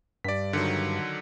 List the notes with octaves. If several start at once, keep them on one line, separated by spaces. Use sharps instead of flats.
G2 D5 B6
D3 D#3 F#3